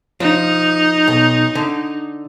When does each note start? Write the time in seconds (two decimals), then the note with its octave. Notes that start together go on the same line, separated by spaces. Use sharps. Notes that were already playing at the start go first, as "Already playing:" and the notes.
0.20 F3 D#4
1.08 B1
1.55 D3